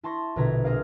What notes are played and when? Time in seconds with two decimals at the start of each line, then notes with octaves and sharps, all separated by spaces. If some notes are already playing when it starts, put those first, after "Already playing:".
0.03 E4 A5 C6 C#6 A#6
0.36 A#1 B2 D3 A#5 G#6 B6
0.64 C4 G#4 A#4 D5 F5